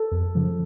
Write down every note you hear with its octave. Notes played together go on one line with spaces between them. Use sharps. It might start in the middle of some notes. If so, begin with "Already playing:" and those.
Already playing: A4
F2
C#3 F3